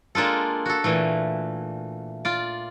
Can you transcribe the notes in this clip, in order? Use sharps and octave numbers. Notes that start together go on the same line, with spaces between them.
G#3 A#3 D4 F4 A4
F#4 A4
A#2 E3 A3
F4 D5